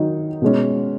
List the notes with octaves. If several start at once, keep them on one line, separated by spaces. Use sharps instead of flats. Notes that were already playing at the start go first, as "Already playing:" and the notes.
Already playing: D#3 F#3 D#4
B2 G#3 C#4